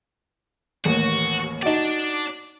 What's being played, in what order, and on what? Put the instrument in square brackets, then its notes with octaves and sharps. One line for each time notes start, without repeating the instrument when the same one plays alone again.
[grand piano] A1 D#2 A#3 [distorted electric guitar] F#4
[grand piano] D#4 F#4 [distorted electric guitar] D5 A5